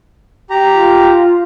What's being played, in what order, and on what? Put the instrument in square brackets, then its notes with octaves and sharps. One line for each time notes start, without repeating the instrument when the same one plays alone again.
[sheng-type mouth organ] G4 A#5
[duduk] F4